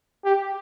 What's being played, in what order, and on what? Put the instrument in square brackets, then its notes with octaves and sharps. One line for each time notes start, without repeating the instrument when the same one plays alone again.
[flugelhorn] G4